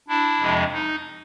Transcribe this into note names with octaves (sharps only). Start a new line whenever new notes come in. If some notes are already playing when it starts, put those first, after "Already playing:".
D4 E4
F2 C3 F3 G#3
D#4